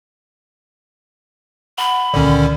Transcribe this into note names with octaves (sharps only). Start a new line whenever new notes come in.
F#5 B5
C#2 A#2 D3 D#3 C#4 D5